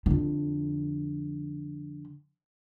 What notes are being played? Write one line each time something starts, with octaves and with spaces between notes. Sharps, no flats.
F2 D3